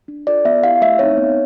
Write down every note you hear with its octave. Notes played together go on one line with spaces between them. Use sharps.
D4
F4 A4 D5
B3 E5
E4 G4 F5
A3 E5
C4 D#4 C#5
B3